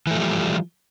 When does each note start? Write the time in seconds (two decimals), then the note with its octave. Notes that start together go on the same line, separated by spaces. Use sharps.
0.07 E3
0.11 A3
0.15 F3
0.19 G3